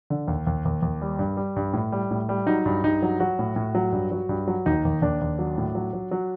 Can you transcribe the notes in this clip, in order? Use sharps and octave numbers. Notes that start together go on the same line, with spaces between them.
D3
D#2
D#2
D#2
D#2
G3
G2
G3
G2
A2
G3
A2
G3
F#3 D#4
G2
G2 D#4
F#3
F#3 F#4
A2
A2
F#3
G2
F#3
G2
F#3
D#2 D#4
D#2
D#2 D4
D#2
F#3
A2
F#3
F#3
F#3